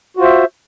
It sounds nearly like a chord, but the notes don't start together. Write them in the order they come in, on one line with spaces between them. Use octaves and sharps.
F#4 F4 C5 E5